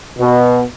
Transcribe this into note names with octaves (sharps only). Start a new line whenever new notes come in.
B2